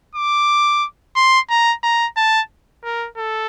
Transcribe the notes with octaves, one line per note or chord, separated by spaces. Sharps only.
D6
C6
A#5
A#5
A5
A#4
A4